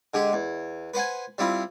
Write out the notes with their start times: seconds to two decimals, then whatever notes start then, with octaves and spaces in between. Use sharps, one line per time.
0.14 D3 G#3 G4
0.33 E2
0.94 B4 C5 F#5 G#5
1.38 G3 C4 E4 F4